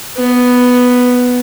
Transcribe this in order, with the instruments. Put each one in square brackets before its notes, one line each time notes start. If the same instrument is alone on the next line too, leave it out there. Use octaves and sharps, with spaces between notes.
[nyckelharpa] B3